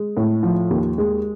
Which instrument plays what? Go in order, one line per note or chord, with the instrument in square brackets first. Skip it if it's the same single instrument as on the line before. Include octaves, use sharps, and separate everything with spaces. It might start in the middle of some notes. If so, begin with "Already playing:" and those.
Already playing: [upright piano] G#3
A2
F3
D#2
G#3